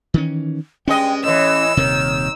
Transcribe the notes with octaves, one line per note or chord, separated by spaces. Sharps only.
D#3 E3 C#4
G2 G#3 C#4 D#5 G5
A2 E3 D#5 E6
D#1 C3 D#3 C#5